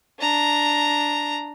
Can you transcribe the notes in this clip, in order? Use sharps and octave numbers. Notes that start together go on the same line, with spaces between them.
D4 A#5